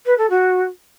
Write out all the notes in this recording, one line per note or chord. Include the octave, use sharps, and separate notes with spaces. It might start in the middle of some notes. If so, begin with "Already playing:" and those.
B4
A4
F#4